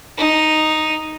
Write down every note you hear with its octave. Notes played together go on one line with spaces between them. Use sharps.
D#4